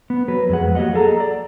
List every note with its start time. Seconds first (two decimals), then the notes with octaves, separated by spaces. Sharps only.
0.10 B3
0.28 F#3 B4
0.49 F2 G#3 F#5
0.75 F#3 A#3 G4 D#5 F#5
0.94 G#4 A4 A#5
1.20 D5